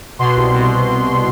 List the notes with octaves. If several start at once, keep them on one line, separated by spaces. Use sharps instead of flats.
B2 C6
C2
B2